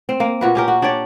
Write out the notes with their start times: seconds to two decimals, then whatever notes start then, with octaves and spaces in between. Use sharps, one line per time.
0.09 C4
0.20 A#3
0.41 A#2 F#4 B4
0.55 C#4 G4 A#4
0.68 F#4
0.82 D4 G4 C#5 D5